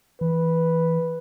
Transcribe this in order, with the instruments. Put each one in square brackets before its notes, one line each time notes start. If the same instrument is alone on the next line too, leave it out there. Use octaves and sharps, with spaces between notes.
[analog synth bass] E3 [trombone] B4